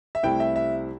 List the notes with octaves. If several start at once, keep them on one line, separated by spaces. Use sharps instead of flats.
E5
C2 C3 A3 C4 E4 G5
E5
E5